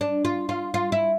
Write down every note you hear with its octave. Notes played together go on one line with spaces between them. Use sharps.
D4
F4
F4
F4
E4